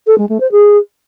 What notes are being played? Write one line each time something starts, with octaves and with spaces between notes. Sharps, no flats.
A4
G#3
A3
C5
G#4